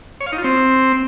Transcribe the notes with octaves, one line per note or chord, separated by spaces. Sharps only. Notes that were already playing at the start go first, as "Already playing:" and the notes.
C#5
F5
D#4
F4
C4